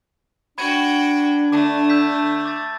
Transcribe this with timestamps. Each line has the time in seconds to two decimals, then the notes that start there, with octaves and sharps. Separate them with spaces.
0.58 D4 F#4 G5 B5 G#6 D#7
1.52 D3 A3 A5 D6
1.90 E6 G6 B6
2.46 D6 A6